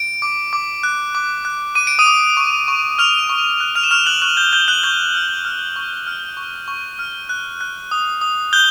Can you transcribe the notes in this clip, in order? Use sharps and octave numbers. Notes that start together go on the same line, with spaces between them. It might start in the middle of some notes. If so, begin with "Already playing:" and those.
Already playing: D7
D6
D6
F#6
D6
F#6
D6 D#7
D7
D#6 D#7
D6
C#6
C#6
C#6 F6 F7
C#6
F#6
F6 F7
E7
C#6 F6 F7
F#6 F#7
C#6 F#6 F#7
G6 G7
F#6 G6 G7
F#6 F#7
C#6 G6 G7
F6
F6
C#6
F6
C#6
C#6
F6
F#6
F#6
D#6
D#6
F#6 G6 G7